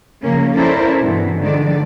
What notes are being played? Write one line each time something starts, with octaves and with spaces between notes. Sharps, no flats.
C#3 F3 A#3 C#4 A#4
C#4 E4 A4 A#4 C5 D5
G2 B2 E3
D3 D#3 F3 G#3 D5